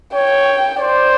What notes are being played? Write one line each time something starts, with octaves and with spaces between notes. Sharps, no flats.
C#5 G5
C5 D5